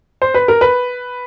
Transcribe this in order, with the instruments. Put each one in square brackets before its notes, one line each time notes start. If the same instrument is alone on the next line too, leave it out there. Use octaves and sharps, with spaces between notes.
[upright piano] C5
B4
A#4
B4